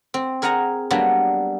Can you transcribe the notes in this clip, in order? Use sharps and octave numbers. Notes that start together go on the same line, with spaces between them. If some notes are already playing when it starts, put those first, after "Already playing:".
C4
G#4 A#4 F#5 G#5 A#5
F#3 G3 A#3 B3 D4